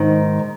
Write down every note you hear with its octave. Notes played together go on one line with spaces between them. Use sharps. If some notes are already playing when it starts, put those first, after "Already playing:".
Already playing: G#2 D#3